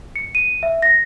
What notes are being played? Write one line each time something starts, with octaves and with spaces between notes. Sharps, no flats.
C#7
D#7
E5
A#6